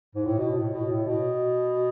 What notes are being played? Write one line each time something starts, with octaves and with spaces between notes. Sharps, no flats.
G#2
A2
B2
A2
B2
A2
B2